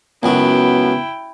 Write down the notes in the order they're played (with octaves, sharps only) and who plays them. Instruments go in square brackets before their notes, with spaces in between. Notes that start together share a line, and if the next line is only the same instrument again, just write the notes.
[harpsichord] C#2 F#2 F#4 [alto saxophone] B3 [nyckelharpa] E4 G5